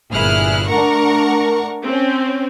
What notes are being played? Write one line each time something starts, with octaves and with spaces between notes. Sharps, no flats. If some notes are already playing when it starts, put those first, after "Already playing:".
G1 A#2 E4 G#4 F6 F#6
A3 D4 A#4 F#5 A#5 C#6
C4 C#4